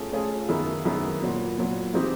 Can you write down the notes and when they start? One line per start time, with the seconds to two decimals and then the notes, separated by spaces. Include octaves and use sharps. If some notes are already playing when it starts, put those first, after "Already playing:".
Already playing: A3 C#4 F4 G#4
0.12 A3 C#4 F4 G#4
0.49 F#2 D#3 G#3 B3 E4
0.85 F#2 D#3 G#3 B3 E4
1.21 A#2 F#3 B3
1.58 A#2 F#3 B3
1.94 E3 G#3 C4 D#4 G4